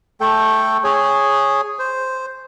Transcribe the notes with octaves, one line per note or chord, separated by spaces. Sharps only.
A3 A4 G5
G#4 C#5
C5